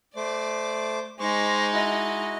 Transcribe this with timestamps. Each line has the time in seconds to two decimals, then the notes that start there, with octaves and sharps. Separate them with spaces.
0.16 A3 C5 D5 D6
1.20 G#3 D#4 C5 C#6 D6
1.73 E4 F#4 D#5